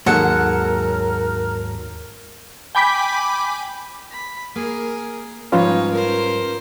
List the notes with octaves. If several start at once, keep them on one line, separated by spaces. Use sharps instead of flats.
D#2 G#2 F#3 A4 A#4 F#5
G5 G#5 B5 D6 G6 B6
B5
A#3 G#4 A#4
G#2 F3 G3 C#4 D#4 F4 B4 C#5
A#4 C5